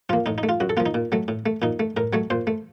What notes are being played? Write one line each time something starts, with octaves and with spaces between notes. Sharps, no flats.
F3 A#3 F4
A2 D#4
D#4
A3
F4
F#2 F#4
A4
F3 A#3 F4
D#4
A#2
F#3 A3
A2
A3
A#2 D#4
A3
A2 A#4
F#3 A3 C#5
A#2 C5
A3